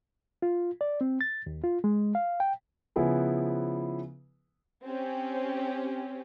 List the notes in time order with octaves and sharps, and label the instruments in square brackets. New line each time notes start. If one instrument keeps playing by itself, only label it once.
[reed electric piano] F4
D5
C4
A6
D#2
F4
G#3
F5
G5
[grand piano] C#3 F3 B3 E4 G#4 B4
[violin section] C4 C#4 G4